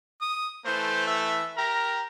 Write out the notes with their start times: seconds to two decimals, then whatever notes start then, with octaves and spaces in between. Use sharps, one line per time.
0.21 D#6
0.66 E3 A3 C5
1.07 E5
1.57 G4 A#4 A#5